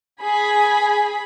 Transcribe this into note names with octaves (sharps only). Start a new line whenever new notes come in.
G#4 B5